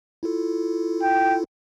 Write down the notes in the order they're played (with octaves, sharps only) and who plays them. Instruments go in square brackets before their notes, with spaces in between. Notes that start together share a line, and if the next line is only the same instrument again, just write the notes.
[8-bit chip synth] E4 F4 A4
[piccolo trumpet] G5